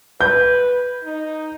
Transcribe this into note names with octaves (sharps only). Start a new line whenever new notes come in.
B4 G6
D#4